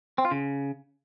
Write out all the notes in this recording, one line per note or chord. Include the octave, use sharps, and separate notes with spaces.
C4
F4
C#3